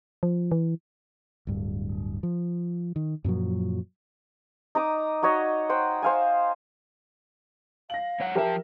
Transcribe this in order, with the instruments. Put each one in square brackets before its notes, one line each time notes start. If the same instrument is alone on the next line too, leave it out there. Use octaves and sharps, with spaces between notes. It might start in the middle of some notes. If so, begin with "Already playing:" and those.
[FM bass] F3
E3
[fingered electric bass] D1 G2
F3
D#3
F#2 A#2 F3 F#3
[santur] D#4 A#5 D6 D#6
D#4 F#4 C#5 D#5
C5 F#5 G5
C5 F5 G#5
[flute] F5 [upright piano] A#6 F#7
[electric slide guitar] G#2 C#5 F#5
[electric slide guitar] F3 A5 [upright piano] G4 A#4 E5 [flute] G5